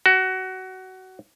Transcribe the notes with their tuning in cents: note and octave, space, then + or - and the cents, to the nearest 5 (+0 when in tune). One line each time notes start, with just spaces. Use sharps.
F#4 +20